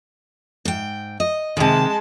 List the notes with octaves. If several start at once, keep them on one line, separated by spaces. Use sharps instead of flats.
G#2 G5
D#5
C3 D#3 G#3 A5